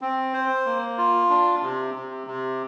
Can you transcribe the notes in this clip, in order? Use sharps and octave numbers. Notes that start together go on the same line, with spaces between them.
C4
C5
A#3
F4
D4
C3
C3
C3